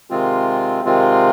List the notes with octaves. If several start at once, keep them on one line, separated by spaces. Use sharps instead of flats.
C3 D#3 G#3 C4 F4
C3 D#3 G#3 C4 F4